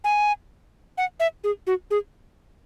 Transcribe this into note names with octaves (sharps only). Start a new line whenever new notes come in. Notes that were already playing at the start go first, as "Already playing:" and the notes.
G#5
F#5
E5
G#4
F#4
G#4